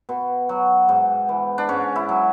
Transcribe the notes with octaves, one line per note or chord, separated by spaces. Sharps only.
B2
F#3
G#2
E3
D4
G#2 C#4
E4
F#3